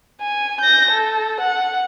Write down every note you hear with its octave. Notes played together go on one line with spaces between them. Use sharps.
G#5
G6 A#6
A4
F#5